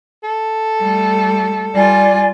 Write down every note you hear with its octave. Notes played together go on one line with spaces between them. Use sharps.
A4
G3 A3
G3 F4 D5 G#5